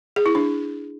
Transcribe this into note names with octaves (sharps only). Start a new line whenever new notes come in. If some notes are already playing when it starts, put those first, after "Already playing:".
G#4
E4
D4